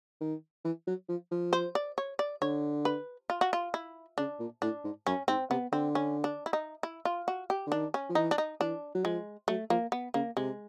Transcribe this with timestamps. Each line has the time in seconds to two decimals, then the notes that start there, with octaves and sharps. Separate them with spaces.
0.21 D#3
0.64 E3
0.87 F#3
1.09 F3
1.31 F3
1.53 C5
1.75 D5
1.98 C#5
2.19 D5
2.41 D3 C#5
2.85 B4
3.30 F4
3.41 F#4
3.53 F4
3.74 E4
4.18 C#3 D4
4.40 A#2
4.62 A2 D4
4.84 G#2
5.07 F#2 C#4
5.28 G#2 C4
5.50 C3 B3
5.72 D3 C4
5.95 C#4
6.24 D4
6.46 E4
6.53 D#4
6.83 E4
7.05 F4
7.28 F#4
7.50 G4
7.67 D3
7.72 D#3 D4
7.94 C#4
8.09 F3
8.15 E3 D#4
8.31 D4
8.38 D#4
8.60 E3 D4
8.95 F#3
9.04 F3 G#3
9.48 F#3 A3
9.70 F3 A#3
9.92 B3
10.14 C#3 A#3
10.37 C3 G#3